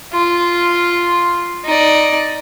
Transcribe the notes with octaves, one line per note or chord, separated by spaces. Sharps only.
F4
D#4 D5